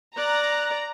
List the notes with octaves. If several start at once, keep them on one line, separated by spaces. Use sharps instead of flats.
D5 A#5 F#6